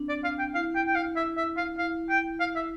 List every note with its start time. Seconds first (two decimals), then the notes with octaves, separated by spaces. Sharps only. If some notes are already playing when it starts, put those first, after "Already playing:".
Already playing: C4 D4
0.09 D5
0.24 F5
0.39 G5
0.54 E4 F5
0.75 G5
0.87 G5
0.95 F5
1.16 E5
1.37 E5
1.57 F5
1.78 E4 F5
2.09 G5
2.40 F5
2.56 E5